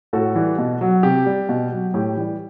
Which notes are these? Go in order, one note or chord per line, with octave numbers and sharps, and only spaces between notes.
A2 F#4 A4
E3 G3
B2
F#3
C3 G4
G3
B2
F#3
A2 G4
E3 G3